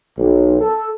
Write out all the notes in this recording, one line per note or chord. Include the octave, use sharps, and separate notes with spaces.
B1
A4